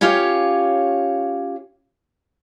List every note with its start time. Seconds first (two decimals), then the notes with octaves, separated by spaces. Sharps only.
0.01 C#4 F4 G4 C#5 F5